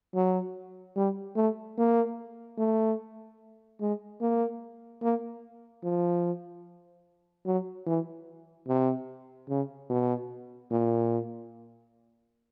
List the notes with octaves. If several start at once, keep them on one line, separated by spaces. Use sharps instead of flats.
F#3
G3
A3
A#3
A3
G#3
A#3
A#3
F3
F#3
E3
C3
C#3
B2
A#2